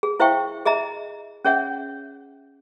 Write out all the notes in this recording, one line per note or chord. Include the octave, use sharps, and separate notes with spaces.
G#4
E4 C5 E5 F5 G5 C#6
G#4 D#5 E5 A#5
C#4 G#4 C#5 E5 F#5